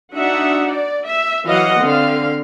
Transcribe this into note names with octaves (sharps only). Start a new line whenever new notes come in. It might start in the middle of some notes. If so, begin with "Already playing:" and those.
D4 D#4 F#4 E5 F#5
D5
E5
E3 F#3 D#5 F5 F#5
D3 C4 F5